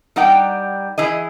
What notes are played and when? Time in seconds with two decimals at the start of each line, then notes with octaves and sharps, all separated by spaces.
0.16 G3 D#4 G4 F#5 G5
0.98 E3 E4 G#4 D#5